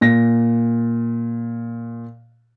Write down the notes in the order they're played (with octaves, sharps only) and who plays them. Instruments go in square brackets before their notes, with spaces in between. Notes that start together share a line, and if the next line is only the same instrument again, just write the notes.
[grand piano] A#2 A#6